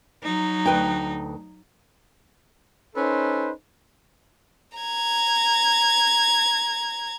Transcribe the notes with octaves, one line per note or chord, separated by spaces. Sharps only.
F#3 D#4
D2 B4 G5
C#4 D#4 A4 B4 C5
A#5 G#6